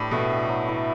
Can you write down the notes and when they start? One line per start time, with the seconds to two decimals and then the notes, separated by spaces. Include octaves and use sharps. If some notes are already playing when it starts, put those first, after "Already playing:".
Already playing: A2 D4 G4 B4
0.11 B2 A3
0.31 D4 G4 B4
0.49 F#3
0.68 A3 E4 B4